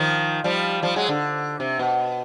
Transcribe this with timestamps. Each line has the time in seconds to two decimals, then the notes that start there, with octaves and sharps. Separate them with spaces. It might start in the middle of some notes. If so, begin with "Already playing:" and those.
Already playing: D#3 F3
0.44 F3 G3
0.82 F3 G3
0.96 F#3 G#3
1.09 D3
1.60 C3
1.79 B2